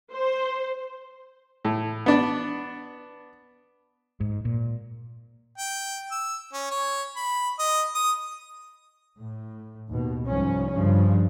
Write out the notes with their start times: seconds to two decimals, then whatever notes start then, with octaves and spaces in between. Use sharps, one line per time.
0.13 C5
1.65 A2
2.06 B3 D4
4.20 G#2
4.45 A#2
5.58 G5
6.11 E6
6.53 C#4
6.71 C#5
7.16 B5
7.59 D#5
7.95 D#6
9.18 A2
9.90 D#2 B2
10.27 C2 G#2 F3 C#4
10.74 G2 C#3 F3